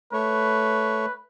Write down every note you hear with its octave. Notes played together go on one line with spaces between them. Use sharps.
A3 B4 C#5